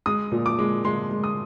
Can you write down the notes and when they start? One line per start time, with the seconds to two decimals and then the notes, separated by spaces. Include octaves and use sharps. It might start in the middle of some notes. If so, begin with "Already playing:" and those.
0.06 G#3 D#6
0.32 A#2
0.46 D6
0.59 G#3
0.85 G#3 C6
1.11 G#3
1.24 D#6